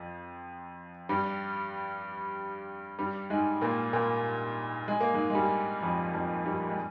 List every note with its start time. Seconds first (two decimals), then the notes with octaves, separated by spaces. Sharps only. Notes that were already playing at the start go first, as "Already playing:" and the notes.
Already playing: F2 F3
1.09 G2 G3
2.99 G2 G3
3.30 G#2 G#3
3.62 A#2 A#3
3.93 A#2 A#3
4.88 G#3
5.00 A#3
5.14 G#2 G#3
5.30 G#3
5.35 G2 G3
5.82 F2 F3
6.14 F2 F3
6.46 G2 G3
6.69 G#3